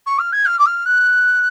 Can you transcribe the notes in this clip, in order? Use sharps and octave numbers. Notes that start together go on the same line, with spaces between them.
C#6
F6
G#6
F6
D6
F6
F#6